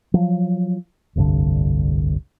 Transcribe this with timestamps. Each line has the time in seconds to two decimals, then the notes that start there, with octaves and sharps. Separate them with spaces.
0.14 F3 F#3
1.15 F1 C2 G2 D3